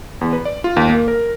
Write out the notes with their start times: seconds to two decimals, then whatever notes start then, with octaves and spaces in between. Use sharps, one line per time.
0.21 E2
0.33 B4
0.45 D5
0.64 F4
0.77 D#2
0.89 A#3
1.08 A#4